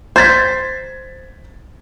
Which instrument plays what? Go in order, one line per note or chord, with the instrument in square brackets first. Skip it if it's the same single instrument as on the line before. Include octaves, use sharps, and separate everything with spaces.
[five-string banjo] C5 [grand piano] G#6 A6 B6